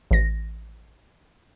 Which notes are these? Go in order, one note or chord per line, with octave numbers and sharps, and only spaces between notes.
A1 A#6